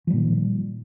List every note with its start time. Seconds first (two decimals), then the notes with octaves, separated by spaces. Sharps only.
0.07 F3
0.10 G3
0.13 A#2
0.16 D#3